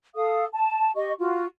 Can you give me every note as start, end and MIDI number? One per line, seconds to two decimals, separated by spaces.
0.15 0.45 69
0.15 0.45 77
0.15 0.45 87
0.53 0.91 81
0.95 1.12 67
0.95 1.12 75
0.95 1.12 85
1.19 1.45 65
1.19 1.45 66